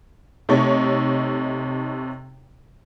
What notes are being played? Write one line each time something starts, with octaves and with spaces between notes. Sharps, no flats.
C3 A3 D#4 C#5